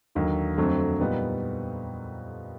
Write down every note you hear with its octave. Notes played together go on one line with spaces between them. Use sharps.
D#2 D3 F#3
F2 D3 F#3 A3 C4
A#2 G3 B3 D#4